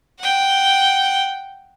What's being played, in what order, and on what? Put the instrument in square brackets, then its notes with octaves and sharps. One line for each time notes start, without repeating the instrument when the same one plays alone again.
[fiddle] F#5 G5